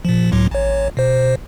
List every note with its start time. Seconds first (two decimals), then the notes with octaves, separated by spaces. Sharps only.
0.05 A#2 F3
0.32 C#2 A2 F#3
0.51 A1 C#5
0.97 B2 C5